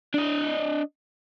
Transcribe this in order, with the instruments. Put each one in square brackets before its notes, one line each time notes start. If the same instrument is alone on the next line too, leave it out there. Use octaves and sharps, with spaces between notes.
[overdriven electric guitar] D4 D#5